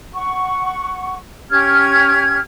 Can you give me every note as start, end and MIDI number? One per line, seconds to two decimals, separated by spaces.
0.14 1.15 78
0.14 1.15 85
1.50 2.38 61
1.50 2.38 67
1.50 2.38 89
1.50 2.38 92